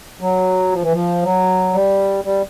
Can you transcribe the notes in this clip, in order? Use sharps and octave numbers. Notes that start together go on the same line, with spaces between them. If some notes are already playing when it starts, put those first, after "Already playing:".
F#3
F3
E3
F3
F#3
G3
G3